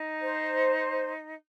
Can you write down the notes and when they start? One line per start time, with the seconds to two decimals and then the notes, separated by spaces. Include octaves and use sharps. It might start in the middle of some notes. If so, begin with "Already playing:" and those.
Already playing: D#4
0.22 C5